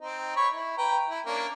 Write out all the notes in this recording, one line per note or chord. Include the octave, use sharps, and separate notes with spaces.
C4 D#4
C#5 B5 C#6
E4
B4 G5 A#5
E4
A#3 C#4 D4